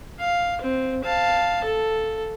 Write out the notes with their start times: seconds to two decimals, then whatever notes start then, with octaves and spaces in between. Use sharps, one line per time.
0.20 F5
0.61 C4
1.04 F5 A5
1.64 A4